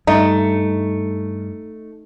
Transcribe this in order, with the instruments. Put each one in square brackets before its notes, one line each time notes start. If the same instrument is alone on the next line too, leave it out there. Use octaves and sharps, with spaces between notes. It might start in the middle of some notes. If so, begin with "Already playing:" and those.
[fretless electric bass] G2 [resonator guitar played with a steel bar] A3 [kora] D#4